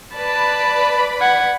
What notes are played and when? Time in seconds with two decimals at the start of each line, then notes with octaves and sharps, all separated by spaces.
0.15 B4 D5 A5 B5
1.21 F#5 G#6